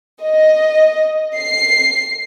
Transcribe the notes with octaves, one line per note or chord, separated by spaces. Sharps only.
D#5
C7